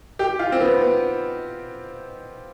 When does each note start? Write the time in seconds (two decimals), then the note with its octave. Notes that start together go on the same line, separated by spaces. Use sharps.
0.19 G4
0.39 F4
0.52 C4
0.60 B3
0.82 B3